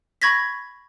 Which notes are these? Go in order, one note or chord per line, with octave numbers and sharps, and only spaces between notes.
B5 C#6 G#6 A#6 B6